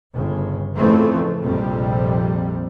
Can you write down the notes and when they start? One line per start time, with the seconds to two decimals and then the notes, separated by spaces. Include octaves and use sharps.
0.14 G1 C#3
0.78 F2 A2 C#3 E3 A3 C4
1.42 A#1 F2 C3 G3